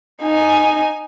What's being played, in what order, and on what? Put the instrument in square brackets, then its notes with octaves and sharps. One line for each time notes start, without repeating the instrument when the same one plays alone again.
[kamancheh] D#4 G#5